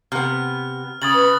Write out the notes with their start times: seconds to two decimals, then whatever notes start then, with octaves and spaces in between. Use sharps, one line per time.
0.12 C3 B3 F6
1.02 C#3 D#6 A6 F#7
1.14 B4